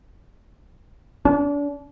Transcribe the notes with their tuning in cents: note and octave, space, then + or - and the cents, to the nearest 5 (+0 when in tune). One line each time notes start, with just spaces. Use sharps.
D4 -35